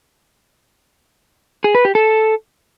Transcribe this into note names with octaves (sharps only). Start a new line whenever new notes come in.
G#4
B4
G4
A4